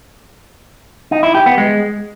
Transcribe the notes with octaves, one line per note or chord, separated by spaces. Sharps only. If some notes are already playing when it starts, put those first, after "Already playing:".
D#4
E4
G4
B3
G#3